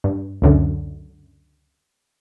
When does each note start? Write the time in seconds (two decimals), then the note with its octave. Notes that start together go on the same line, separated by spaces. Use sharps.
0.04 G2
0.42 C#2 F#2 D3